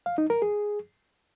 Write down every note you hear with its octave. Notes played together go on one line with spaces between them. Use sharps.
F5
D#4
A#4
G#4